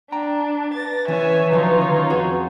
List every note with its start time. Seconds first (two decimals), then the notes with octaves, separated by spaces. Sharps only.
0.12 D4 G5 A#5
0.74 B4 A6 A#6
1.08 E3 C#4 C#5 E5 G#5
1.51 D3 F3 F#3 D#4 F4 C#5
1.81 D#3 C#4
2.10 F2 F#4 G#4